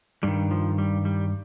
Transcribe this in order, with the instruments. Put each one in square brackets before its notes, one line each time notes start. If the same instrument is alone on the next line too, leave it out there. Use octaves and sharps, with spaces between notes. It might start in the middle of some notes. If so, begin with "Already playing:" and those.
[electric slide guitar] G2 D#3 G3
F3
G3
G3